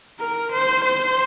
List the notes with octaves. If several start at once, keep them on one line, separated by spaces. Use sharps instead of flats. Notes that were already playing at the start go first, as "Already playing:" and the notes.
A#4
C5
C5